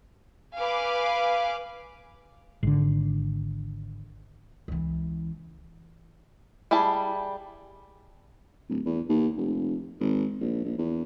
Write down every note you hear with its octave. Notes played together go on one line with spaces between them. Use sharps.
B4 F5 G#5 D6
G#1 D3
C#2 E3
G3 E4 G#4 A5
D1
E2
D#2
F1
G#1
A#1
A#1
E2